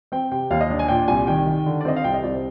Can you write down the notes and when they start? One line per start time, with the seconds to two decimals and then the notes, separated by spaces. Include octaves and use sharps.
0.12 C4 G5
0.31 C3 G5
0.51 D#2 F5
0.61 D#5
0.70 D4
0.79 G#5
0.88 A#2 G5
1.08 C2 G#5
1.27 D#3 G5
1.46 D#3
1.66 D3
1.81 D5
1.85 C4 D#5
1.96 F5
2.04 C2 G5
2.14 D#5
2.23 C2 D5
2.33 C5